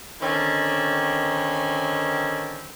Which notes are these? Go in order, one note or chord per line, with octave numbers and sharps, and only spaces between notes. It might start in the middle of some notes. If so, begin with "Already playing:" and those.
D3 D#3 C4 C#4